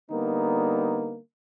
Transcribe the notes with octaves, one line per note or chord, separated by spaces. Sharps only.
D3 G3 A#3 B3 D#4